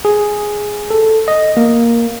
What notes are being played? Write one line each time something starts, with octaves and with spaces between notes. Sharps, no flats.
G#4
A4
D#5
A#3